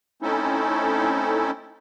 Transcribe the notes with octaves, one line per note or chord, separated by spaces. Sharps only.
A3 C4 C#4 D#4 E4 A4